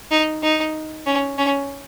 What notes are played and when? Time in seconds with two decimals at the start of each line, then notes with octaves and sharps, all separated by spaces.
0.11 D#4
0.43 D#4
1.06 C#4
1.38 C#4